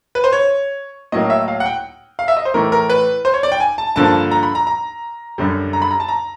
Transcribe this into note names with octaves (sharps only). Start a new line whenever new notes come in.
B4
C5
C#5
A2 F#3 A#3 D#5
E5
F5
F#5
G5
F5
E5
D#5
C5
A2 E3 A3 A#4
A#4
B4
C5
C#5
D5
G5
G#5
A5
G2 D3 F3 A#3 A5
A#5
B5
A#5
A#5
F#2 D3 G3
A#5
B5
A#5
A5
A#5